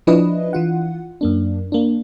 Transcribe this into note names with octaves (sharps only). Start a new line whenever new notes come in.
F3 D4 E4 B4 D#5
E3 F4 F#5
F#2 A#3 D4
A#3 D4